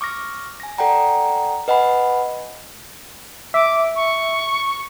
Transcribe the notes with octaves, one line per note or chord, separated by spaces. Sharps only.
C#6 D6 F6 A#6
G#5 A#6
A4 D5 F#5 G5 A#5
B4 D#5 F#5 G#5 B5
E5 D6
C#6